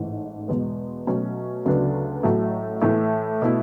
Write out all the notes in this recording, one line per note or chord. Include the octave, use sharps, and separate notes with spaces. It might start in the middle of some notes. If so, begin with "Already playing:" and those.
Already playing: A1 G#2 E3 A3
E2 B2 G#3 B3
B2 F#3 A3 C#4 F#4
D2 C#3 F#3 B3 D4
A1 A2 F#3 A3
A2 E3 A3
B2 A3 E4